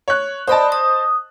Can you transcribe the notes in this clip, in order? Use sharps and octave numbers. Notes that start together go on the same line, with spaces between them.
C#5 F#6
C5 D5 D#5 A5 B5 D#6
D#6